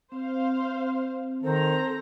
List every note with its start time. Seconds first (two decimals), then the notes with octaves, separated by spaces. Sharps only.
0.12 C4 C5 F5
1.43 D#3 A4 C5 A#5